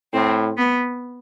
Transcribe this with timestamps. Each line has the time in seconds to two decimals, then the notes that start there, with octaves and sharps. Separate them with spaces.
0.13 A2 C4
0.57 B3